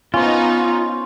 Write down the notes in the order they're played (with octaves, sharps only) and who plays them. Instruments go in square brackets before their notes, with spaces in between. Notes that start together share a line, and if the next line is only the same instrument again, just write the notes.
[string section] B3 D#4 [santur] C#4 C5 [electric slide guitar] F4